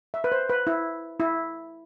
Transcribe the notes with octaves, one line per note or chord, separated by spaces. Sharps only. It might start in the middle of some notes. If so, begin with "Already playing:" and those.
E5
B4
C5
B4
E4
E4